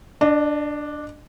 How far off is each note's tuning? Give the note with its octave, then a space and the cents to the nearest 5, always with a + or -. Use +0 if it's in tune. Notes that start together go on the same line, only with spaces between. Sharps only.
D4 +0 D#5 -45